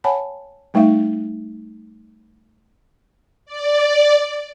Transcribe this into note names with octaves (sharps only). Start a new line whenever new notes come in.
C#5 F#5 G#5 A5 B5
G3 A3 D#4 E5 F5
D5